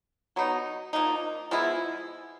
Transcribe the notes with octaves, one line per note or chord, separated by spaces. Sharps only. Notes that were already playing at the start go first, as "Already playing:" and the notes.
F#3 B3 D#4
F3 A#3 D#4
F3 G#3 B3 E4